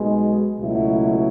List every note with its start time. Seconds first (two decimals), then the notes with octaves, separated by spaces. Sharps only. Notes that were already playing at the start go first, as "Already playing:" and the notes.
Already playing: B1 B2 G#3
0.59 C#2 B2 F#3 A3 E4